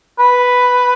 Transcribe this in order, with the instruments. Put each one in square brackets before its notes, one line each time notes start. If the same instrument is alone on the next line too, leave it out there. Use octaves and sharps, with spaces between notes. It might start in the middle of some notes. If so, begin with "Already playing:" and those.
[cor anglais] B4